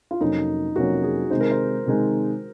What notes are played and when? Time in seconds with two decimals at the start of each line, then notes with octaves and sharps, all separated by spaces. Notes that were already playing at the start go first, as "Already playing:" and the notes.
0.11 F4
0.20 F2 C3 F#3 A#3 C#4 D#4
0.76 F2 C3 F#3 A#3 C#4 F#4
1.03 G#4
1.30 C3 D#3 G#3 D#4 C5
1.41 A#4
1.51 C5
1.86 C3 D#3 G#3 D#4